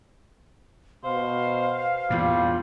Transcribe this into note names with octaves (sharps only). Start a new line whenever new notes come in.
B2 C5 F5
E2 G2 A#2 G3 F4